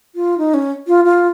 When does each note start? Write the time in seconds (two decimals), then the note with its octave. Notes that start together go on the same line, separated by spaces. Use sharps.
0.15 F4
0.38 D#4
0.54 C#4
0.88 F4
1.05 F4